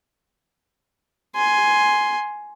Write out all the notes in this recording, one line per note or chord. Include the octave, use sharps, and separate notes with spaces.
G#5 C6